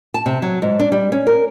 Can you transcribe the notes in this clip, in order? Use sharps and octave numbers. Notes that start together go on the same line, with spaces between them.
A5
C3
F#3
G#2
D4
G3
C#4
A#4